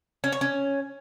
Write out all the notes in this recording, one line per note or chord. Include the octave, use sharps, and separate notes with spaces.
C#4
C#5
C#4